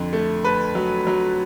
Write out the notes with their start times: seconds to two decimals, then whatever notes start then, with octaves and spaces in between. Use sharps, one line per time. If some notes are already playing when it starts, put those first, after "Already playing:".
Already playing: F2 D3
0.13 A3
0.44 A3 B4
0.75 F#3
1.07 F#3